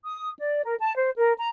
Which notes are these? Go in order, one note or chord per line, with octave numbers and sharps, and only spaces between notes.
D#6
D5
A#4
A5
C5
A#4
A#5